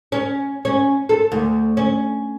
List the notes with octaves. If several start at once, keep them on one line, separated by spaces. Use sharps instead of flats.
C#4
C#4
A4
D2
C#4